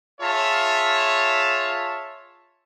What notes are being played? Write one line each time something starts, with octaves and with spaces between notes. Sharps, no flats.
F4 G#4 C#5 E5 A5